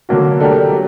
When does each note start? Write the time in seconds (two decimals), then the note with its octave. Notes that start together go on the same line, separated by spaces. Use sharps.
0.09 D3 F#3 A#3 F#4
0.40 A3 D4 G4 A#4
0.72 F#3